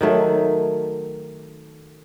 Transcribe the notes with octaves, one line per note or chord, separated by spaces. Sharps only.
D#3 F#3 A3